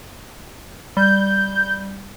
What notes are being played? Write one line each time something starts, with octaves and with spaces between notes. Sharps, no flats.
G3 G6